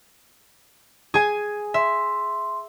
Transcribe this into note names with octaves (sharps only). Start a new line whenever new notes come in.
G#4 G#5
E5 C6